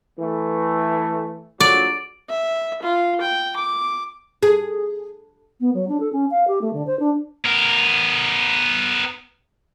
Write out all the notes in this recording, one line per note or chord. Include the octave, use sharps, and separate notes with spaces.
E3 A3
A#1 F#3 D5
E5
F4
G5
D6
G#4
B3
F#3
D4
A4
C#4
F5
G4
A3
D3
C5
D4
B3 A#4